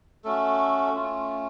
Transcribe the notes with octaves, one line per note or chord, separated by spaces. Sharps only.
A3 C#4 F#4 A4
A3 C#4 F4